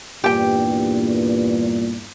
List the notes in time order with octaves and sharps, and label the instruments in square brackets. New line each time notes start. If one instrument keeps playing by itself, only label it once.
[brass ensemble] E2 G2 [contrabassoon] A#2 [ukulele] G4 G5